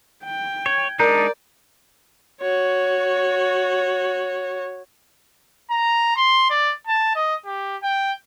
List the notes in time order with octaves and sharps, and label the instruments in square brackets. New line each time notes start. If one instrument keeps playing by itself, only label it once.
[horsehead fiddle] G5
[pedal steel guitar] C#5 [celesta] G#6
[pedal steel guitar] G#3 D4 D#4 [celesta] A#4 A#5 G6 [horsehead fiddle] D5
[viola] F#4 C#5
[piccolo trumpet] A#5
C6
D5
A5
D#5
G4
G5